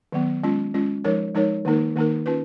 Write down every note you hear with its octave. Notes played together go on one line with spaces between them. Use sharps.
D#3 F#3 B3
G#3 C#4 F4
G#3 C#4 F4
F3 G#3 D#4 A#4 C#5
F3 G#3 D#4 A#4 C#5
D#3 A#3 D#4 A#4
D#3 A#3 D#4 A#4
C#4 F4 B4